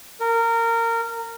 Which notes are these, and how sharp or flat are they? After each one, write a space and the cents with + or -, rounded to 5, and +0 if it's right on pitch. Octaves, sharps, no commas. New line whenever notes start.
A#4 -20